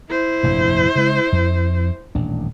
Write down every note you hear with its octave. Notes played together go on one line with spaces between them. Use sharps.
E4 C5
F1 A#1 G2
C#3 G#3
F2
D#1 A1 D4